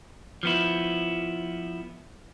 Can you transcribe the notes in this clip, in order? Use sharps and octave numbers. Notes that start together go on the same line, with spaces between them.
F3 B3 E4